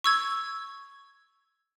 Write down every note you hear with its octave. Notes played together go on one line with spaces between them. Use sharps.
C#6 E6 G#6